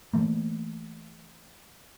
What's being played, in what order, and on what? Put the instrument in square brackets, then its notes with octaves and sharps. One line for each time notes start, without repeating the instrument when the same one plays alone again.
[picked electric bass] E3 A3 A#3